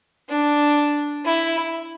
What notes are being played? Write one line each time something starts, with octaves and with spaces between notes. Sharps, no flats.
D4
E4